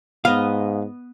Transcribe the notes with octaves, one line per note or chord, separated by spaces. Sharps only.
G#2 B3 D#5 F5